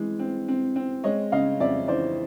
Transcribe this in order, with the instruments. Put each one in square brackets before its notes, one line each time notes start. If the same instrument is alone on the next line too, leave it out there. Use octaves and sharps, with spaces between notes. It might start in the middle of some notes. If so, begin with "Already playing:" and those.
Already playing: [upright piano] E3 G#3 C4
C4
C4
C4
G#3 C#5 D#5
C#3 D#5 F5
F2 D5 E5
E3 C5 D5